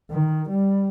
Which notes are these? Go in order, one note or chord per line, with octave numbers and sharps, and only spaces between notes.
D#3
G3